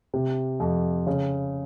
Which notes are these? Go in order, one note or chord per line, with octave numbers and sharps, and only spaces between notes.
C3
F2
C#3